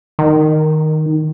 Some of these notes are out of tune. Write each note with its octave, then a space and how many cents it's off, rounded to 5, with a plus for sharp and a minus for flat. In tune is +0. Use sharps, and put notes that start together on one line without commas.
D#3 +0